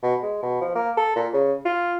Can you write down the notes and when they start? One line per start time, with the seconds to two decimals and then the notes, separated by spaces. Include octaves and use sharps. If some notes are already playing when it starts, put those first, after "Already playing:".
0.03 B2
0.22 G#3
0.43 B2
0.61 F3
0.75 A#3
0.97 A4
1.16 A#2
1.33 C#3
1.65 F4